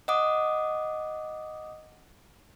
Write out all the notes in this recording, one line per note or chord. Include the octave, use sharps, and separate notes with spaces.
D#5 F#5 D6 D#6